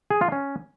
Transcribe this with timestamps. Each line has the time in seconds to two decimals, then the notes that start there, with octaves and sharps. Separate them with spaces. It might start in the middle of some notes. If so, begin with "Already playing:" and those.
0.10 G#4
0.21 F4
0.32 C#4